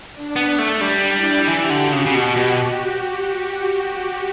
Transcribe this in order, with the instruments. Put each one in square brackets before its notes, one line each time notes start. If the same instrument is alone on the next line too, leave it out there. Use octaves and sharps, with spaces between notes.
[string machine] D4
[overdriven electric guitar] B3
A3
[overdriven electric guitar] G3 [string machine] D4
[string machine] E4
[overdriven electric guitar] E3 [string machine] G4
[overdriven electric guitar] D3
[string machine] F#4
[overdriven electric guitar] C#3
C#3
B2
B2